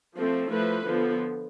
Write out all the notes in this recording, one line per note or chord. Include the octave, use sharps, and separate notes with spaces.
F3 A3 C4
F3 A3 E4 B4
D3 F3 B3